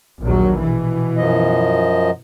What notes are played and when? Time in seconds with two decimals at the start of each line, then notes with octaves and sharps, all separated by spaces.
0.21 A#1 D#2 F#3
0.61 B2 E3
1.17 F#2 F3 D#5